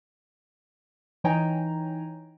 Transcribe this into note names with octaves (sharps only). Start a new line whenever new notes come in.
E3 D#4 C#5 G5 G#5 A#5